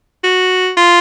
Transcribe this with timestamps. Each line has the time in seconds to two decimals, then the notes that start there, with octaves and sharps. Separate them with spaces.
0.24 F#4
0.77 F4